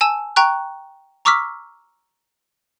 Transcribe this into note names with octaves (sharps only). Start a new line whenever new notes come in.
G#5 A5 E6 E7
G5 A#5 C#6 F#6
A#5 C#6 D6 E6 F6 B6